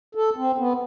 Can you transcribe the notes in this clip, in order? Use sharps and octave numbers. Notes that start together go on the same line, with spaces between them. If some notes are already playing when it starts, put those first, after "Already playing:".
A4
C4
B3